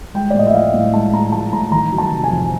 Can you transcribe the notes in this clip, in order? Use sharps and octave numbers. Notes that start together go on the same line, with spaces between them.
G#3 G5
D5
A2 D#5
E5
F3 F5
A2
G#3 A5
A2 A#5
F3 A5
A2 A#5
D#3 A#5
F#3
A5
C3
G#5
F2